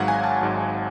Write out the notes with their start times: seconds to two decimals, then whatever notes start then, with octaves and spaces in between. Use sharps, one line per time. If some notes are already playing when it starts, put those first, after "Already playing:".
Already playing: G#1 G#2 F#3 F5 F#5
0.08 G#5
0.24 A5
0.41 G#1 G#2 F#3